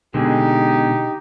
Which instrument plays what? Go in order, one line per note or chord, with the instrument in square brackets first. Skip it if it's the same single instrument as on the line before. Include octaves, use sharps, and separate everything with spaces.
[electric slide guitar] B2 D3 G#3 [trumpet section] D#4 G4